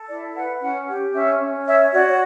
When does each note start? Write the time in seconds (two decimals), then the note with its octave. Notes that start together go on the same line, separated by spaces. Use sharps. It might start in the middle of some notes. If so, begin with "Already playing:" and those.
Already playing: A4
0.08 E4 D5
0.34 B4 F#5
0.60 C#4 F#5
0.87 G4
1.13 C#4 E5
1.39 C#4
1.65 C#5 E5
1.91 F#4 D5